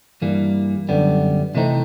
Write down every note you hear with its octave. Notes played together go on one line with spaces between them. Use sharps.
G2 E3 G3 A#3
F#2 D3 G3 B3
C3 E3 A3 C4 D#4